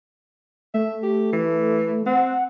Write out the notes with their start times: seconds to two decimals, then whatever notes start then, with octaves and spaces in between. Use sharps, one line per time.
0.74 A3 E5
1.03 G4
1.33 E3
2.06 C4 F#5